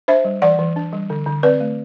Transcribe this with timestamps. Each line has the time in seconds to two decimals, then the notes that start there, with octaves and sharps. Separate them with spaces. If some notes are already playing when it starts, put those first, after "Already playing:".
0.08 D4 C5 E5
0.25 G3
0.42 E3 D5 F#5
0.59 E3
0.76 D4
0.93 G3
1.10 D3
1.26 D3
1.43 C4 B4 D5
1.61 A3